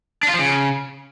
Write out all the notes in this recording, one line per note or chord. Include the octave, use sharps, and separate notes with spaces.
D4
F4
F3
C#3